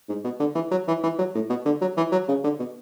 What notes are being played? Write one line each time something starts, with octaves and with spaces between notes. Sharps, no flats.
G#2
B2
D3
E3
F#3
E3
E3
F#3
A2
B2
D3
F#3
E3
F#3
C#3
D3
B2